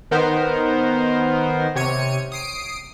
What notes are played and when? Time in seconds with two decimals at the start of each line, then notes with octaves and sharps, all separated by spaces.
0.11 D#3 B3 D#4 A#4 C5
1.76 C3 C#5 C#7 D#7
2.32 D#6 C7 D7